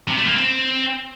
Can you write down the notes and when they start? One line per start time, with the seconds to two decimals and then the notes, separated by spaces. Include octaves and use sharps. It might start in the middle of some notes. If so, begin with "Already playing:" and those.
0.08 C3
0.18 A3
0.27 A#3
0.36 C4